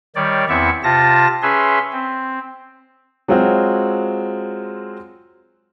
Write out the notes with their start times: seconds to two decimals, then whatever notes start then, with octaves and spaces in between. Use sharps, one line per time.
0.16 D#3 G3 C#5 D5
0.49 E2 B3 C4 E4 E5 C#6
0.83 C3 F4 A5 A#6
1.42 C#4 G#4 B4 E5 C6
1.93 C4
3.28 F#3 G#3 C4 F4 F#4